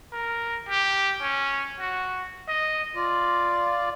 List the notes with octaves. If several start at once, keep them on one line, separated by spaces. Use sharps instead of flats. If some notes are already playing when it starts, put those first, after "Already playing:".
A#4
G4
C#4
F#4
D#5
F4 D5